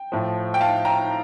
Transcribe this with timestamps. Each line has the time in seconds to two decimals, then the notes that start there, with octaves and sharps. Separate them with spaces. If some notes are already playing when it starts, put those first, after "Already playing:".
Already playing: G5
0.12 A2 F3
0.54 G5
0.60 F5 A5
0.85 G5 A#5